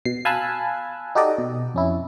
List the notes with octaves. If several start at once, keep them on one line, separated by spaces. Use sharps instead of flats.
B2 C7
F5 G#5 A5 B5 E6 F#6
D#4 F#4 G4 A4 D5 D#5
B2
F2 C#4 E4